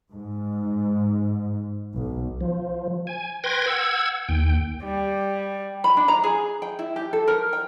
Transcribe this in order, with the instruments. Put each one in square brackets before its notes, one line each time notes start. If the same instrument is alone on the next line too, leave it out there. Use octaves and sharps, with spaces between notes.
[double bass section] G#2
B1
[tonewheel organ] F3
G#5
B4 G5 C6 G#6 A#6
F#5 E6 G#6
D#2 G5
[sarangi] G3
[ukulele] B5
D4
A#5
G#4
G5
E4
G4
A4
A#4
G5